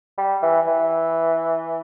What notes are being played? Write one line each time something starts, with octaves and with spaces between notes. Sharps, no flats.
G3
E3
E3